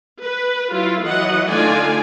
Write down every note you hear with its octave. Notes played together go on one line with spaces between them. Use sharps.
B4
F#3 E4 F4
E3 F#3 D#5 F#5
D3 A3 D#4 F4 D5 G#5